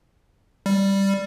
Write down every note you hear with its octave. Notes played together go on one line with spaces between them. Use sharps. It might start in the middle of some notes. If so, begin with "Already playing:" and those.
G3